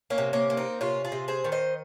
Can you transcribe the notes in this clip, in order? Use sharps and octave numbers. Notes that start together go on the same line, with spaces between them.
A#3 C#4
C3
A#3 C#4
A#3
C4 D#4
C3 C#4 F4
F4 G#4
C3
G#4 C5
D#3
C5 D#5